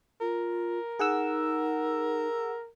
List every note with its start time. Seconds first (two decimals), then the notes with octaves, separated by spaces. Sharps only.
0.21 F4 A#4
0.99 D#4 G#4 F#5 E6